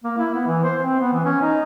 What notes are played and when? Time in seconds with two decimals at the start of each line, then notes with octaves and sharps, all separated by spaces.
0.04 A#3
0.18 E4
0.34 B3
0.47 E3
0.64 C5
0.81 C4
1.00 B3
1.13 E3
1.25 C#4
1.42 D#4